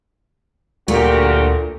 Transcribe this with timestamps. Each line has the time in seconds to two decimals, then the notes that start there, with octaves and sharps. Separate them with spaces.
0.88 D2 A#2 A3 F#4 G4 A#4